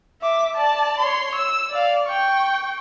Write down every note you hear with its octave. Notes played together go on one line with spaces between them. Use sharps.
E5 D6
D5 A5
C#5 C6
E6
D5 F5
G5 C#6